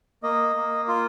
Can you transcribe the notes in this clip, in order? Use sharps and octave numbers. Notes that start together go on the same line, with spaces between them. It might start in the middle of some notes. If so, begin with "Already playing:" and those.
A#3 D#5
A#3
F4